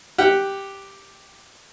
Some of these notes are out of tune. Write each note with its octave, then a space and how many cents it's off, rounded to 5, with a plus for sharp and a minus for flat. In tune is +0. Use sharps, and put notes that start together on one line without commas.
G4 +0 F#5 +0